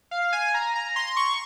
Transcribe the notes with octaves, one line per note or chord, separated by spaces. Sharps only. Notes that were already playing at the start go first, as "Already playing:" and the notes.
F5
G#5
A#5
A#5
C6
C#6